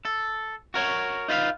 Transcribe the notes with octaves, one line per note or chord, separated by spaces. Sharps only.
A4
F#4 A#4 C#5
D#4 F4 B4 D5 F5